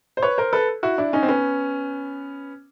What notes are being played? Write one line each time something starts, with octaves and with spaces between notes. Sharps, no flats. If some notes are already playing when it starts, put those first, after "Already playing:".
C5
B4 C#5
A#4 C5
A4 B4
E4 F#4
D4 E4
C#4 D#4
C4
B3 C#4